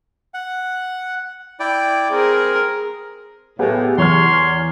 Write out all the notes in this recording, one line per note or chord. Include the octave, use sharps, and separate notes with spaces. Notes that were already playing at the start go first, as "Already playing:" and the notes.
F#5
E4 D5 G5
C4 G#4 A#4
A2 B3 G4 G#4
E2 C#5 C6 F6